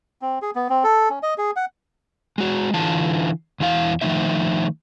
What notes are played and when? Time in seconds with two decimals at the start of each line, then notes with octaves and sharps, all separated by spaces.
0.22 C4
0.42 G#4
0.55 B3
0.70 C4
0.84 A4
1.10 C#4
1.23 D#5
1.38 G#4
1.56 F#5
2.38 G#3 F#4
2.74 D3 E3 F4 A5
3.60 E2 E3 E4 F5
4.01 D#3 F3 A3 D#4 E5